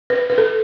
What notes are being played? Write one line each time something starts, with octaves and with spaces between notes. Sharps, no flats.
B4
B4
A4